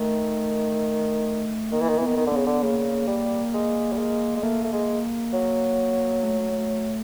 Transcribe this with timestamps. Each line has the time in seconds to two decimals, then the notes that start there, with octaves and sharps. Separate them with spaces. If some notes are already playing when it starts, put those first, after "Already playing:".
Already playing: D#3 A3
1.72 D#3 A#3
1.81 E3
1.89 D#3
1.98 E3
2.02 D#3 B3
2.17 D#3
2.27 D3
2.32 C#3 B3
2.47 D3
2.63 C#3 A#3
3.08 G3
3.53 G#3
3.92 G3
3.98 G#3
4.37 G#3
4.43 A3 A#3
4.64 A3
4.73 G#3
5.33 F#3
6.23 A3